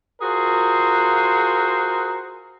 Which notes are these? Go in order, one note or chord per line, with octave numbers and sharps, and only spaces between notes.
F4 F#4 G#4 A#4 C5